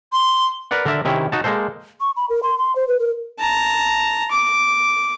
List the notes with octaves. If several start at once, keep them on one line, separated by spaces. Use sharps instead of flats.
C6
A#4 B4 D5 F#5
D3 A#4 D5 E5
C3 D#3 C#4 E4
D#4 F#4 A5
G#3 A#3 A4 C5
C#6
B5
A#4
C6
C6
C5
B4
A#4
A5 A#5
D6